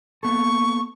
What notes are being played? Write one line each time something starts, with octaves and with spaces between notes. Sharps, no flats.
A#3 B3 A4 C#6